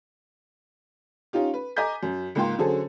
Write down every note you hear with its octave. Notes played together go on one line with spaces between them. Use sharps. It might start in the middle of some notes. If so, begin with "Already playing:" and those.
C#4 D#4 F4 G4
B4
D#5 G#5 A#5 D6 G6 B6
F#2
C#2 G#2 A#3 F4 G5 C6
D3 F#3 C#4 G#4 A4 C5